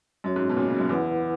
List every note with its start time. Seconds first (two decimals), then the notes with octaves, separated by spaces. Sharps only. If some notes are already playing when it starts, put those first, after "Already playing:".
0.24 F#2 C#4 F#4 C#5
0.36 G#2
0.49 B2
0.57 A#2
0.68 C#3
0.79 F#2
0.89 E2 E4 B4 F#5